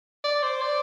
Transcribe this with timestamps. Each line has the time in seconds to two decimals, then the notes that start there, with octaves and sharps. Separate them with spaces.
0.24 D5
0.43 C5
0.61 D5